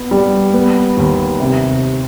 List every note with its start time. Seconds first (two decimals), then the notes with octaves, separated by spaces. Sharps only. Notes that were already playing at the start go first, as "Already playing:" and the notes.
Already playing: B3
0.11 G3
0.54 B3
0.97 D#2
1.40 C3